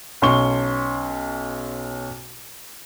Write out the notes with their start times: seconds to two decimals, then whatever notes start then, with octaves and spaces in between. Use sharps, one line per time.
0.22 B1 C#4 C6 C#6 G7